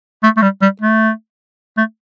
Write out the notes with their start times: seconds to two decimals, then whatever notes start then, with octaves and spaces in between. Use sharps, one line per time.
0.23 A3
0.37 A3
0.42 G3
0.62 G3
0.81 A3
1.78 A3